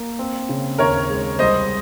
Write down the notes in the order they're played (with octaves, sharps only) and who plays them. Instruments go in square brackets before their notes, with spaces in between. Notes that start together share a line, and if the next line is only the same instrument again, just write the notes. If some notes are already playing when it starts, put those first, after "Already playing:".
Already playing: [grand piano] A#3
C4
C#3
[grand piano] D#2 [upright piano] A#4 C#5
[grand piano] G#3
[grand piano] C2 [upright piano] C5 D#5